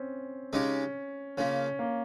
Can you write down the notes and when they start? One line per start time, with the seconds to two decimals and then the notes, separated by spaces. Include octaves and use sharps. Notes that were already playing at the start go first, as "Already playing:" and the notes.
Already playing: C4 C#4
0.53 C#3 G#3 C#4 D#4 G4
1.37 C#3 F3 A#3 C#4
1.79 A#3